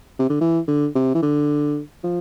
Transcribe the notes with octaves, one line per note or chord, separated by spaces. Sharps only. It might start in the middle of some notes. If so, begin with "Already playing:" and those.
C3
D3
E3
D3
C3
E3
D3
F3